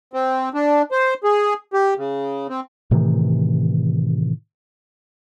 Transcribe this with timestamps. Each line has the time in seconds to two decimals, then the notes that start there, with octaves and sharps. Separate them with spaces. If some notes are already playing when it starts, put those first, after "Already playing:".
0.13 C4
0.54 D4
0.92 C5
1.24 G#4
1.73 G4
1.97 C#3
2.49 C4
2.91 A2 C3 D#3 E3